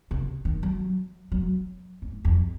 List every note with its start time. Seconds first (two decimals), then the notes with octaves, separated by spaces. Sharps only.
0.11 C#3
0.45 D#3
0.63 F#3
1.32 F#3
2.02 G#2
2.25 F2